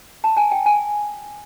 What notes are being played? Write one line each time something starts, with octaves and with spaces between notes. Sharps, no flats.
A5
G#5
G5
G#5